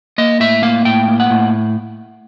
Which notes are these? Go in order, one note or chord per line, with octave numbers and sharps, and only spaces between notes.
A#3 D#5
A2 E5
A#3 F5
A2 G5
A#3
F#5
A2